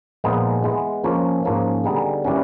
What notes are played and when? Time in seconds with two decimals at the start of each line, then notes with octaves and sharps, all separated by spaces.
0.24 A#2 F3 G#3 B3 D#4
0.63 E3 G#3 B3
1.04 F3 A#3 C#4
1.43 G#2 F3 A#3 C#4
1.84 D3 G3 B3 D#4 G#4
2.24 E3 G3 A#3 C#4 F#4